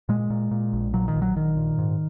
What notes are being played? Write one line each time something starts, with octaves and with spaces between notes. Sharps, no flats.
A#2 G#3
A#2
A#2
A#1
A#2 F#3
D#3
A#1
F#3
A#1 D#3
A#2
G#2